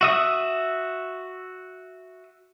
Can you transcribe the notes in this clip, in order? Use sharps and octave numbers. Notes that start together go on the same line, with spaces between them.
F#4 E5 D#6